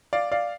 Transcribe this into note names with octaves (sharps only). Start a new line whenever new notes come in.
D5 F5
D5 F5